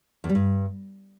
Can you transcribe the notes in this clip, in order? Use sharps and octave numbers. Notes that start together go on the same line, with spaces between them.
E2
G3
G2